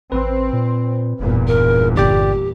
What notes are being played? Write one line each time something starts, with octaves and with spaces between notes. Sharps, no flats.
A1 C4 B4
A#2
E1 E2 G2 A#2
A#4
G1 G4 D5 G5